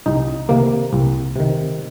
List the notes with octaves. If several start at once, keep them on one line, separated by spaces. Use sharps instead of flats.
C2 D#4
C3 D#3 A#3
C2
C3 D#3